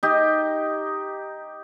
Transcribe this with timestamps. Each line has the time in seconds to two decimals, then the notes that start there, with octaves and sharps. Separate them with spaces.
0.03 D#4 G4